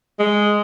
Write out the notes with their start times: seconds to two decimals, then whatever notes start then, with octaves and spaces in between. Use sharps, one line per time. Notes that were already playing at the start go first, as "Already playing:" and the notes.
0.19 G#3